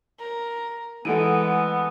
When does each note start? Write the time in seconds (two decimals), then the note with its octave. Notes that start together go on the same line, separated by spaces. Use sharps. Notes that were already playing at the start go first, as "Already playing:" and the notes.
0.19 A#4
1.05 E3 G#3 A3 B3 A4 F#5 D7 D#7